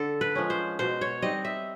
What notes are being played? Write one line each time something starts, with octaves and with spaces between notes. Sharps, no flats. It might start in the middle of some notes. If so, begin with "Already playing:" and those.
Already playing: D3 A4
B4
F3 G#3 C#4
C5
B2 C5
C#5
G3 C4 D#4 D#5
E5